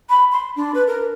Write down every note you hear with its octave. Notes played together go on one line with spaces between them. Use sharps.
B5
C6
D4
B4
A#4